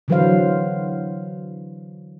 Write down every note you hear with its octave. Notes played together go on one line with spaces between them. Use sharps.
D3 E3 F#3 B4 C5 F5